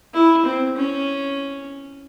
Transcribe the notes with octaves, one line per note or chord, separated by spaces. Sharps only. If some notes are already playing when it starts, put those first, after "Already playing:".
E4
C4
C#4